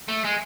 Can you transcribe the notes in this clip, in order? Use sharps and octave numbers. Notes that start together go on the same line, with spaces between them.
A3
G#3